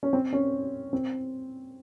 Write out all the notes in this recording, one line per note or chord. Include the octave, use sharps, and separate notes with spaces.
C#4
C4
C#4
C4